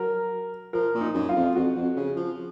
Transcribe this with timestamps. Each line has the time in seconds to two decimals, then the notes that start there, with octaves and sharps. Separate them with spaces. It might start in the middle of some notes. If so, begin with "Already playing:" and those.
Already playing: F#3 A#4
0.73 F3 A#4
0.94 A#2
1.01 D#4
1.14 F#2
1.29 F4
1.35 F2
1.55 F2 F#4
1.76 F2
1.96 C#3
2.16 F3